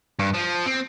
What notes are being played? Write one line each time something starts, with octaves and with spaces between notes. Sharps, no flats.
G2
F3
C4